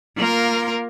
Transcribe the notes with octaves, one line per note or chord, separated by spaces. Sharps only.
A#3 F4 A#4